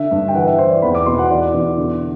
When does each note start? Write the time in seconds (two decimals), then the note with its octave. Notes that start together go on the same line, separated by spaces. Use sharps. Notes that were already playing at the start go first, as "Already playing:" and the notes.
Already playing: D3 E5
0.11 G2
0.28 G5
0.35 E3 F#5
0.46 E5
0.58 E3 C5
0.70 D5
0.82 E2 B5
0.95 D6
1.06 B2 C6
1.18 F#5
1.30 E2 D5
1.54 E2
1.78 D3